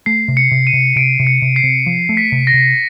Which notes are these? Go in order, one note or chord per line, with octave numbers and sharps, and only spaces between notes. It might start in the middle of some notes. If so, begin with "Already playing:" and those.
A3 C7
C3
C#7
C3
D#7
C3
C3 D7
C3
C#7
C3
C7
C3
F3
A3
B6
C3
A#6
C3